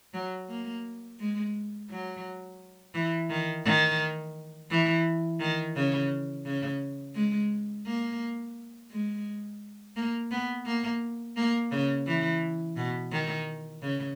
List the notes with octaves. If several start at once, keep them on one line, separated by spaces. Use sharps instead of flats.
F#3
A#3
G#3
F#3
E3
D#3
D#3
E3
D#3
C#3
C#3
G#3
A#3
G#3
A#3
B3
A#3
A#3
C#3
E3
B2
D#3
C#3